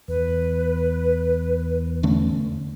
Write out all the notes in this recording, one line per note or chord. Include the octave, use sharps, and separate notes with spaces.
E2 B4
D3 A3 C#4